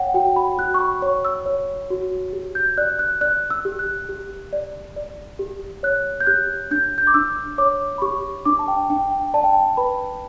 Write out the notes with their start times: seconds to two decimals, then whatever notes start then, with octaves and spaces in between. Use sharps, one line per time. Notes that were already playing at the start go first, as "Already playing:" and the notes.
Already playing: C#5 F#5 G5
0.14 F#4 G5
0.36 B5
0.58 F#4 F#6
0.74 C#6
0.80 B5
1.02 C#5 C#6
1.25 E6
1.46 C#5
1.90 F#4
2.33 G4
2.55 G6
2.77 D5 F#6
2.99 F#6
3.21 D5 F#6
3.50 E6
3.65 G4
3.79 F#6
4.09 G4
4.53 D5
4.96 D5
5.39 G4
5.83 C#5 F#6
6.20 G6
6.27 G4 F#6
6.71 D4 G6
6.98 G6
7.07 D6
7.14 D4 E6
7.58 C#5 D6
7.98 B5
8.02 G4 C#6
8.45 D4 D6
8.59 A5
8.68 G5
8.90 D4 G5
9.11 G5
9.34 D5 A5
9.44 G5
9.53 A5
9.77 B4 B5